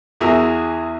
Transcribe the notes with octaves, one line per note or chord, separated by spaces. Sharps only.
E2 E4 F#4 G#4 A#4 E5